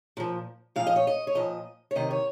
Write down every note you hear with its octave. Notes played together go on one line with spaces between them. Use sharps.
A#2 F3
A#2 F3 F5
D#5
C#5
D#5
C#5
A#2 F3 D#5
C#5
C3 D#3 D#5
C#5